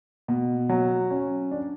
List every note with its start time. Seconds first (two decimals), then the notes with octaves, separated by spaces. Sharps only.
0.28 B2
0.69 F#3
1.10 C#4
1.51 D4